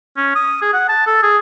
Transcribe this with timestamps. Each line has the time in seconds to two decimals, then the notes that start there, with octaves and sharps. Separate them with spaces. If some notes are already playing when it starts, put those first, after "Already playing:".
0.17 C#4
0.35 D#6
0.61 G#4
0.73 F#5
0.89 A5
1.07 A4
1.22 G#4